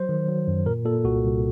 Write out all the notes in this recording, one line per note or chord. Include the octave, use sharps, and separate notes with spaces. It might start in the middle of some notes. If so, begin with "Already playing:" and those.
Already playing: F#3 C5
D#3
F#3
F#2
A#2 A#4
A#2 A4
C2 F#4
C2